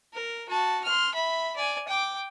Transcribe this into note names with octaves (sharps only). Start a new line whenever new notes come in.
A#4
F#4 A5
C6 F6
E5 B5
D5 G#5
G5 D6